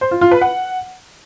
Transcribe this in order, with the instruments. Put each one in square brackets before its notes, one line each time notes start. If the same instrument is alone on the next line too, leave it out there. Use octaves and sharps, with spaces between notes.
[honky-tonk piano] C5
F4
F4
B4
F#5